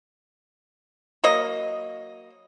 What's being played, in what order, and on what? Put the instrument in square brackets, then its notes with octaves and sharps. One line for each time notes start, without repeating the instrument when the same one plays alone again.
[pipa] F#3 A#3 D#5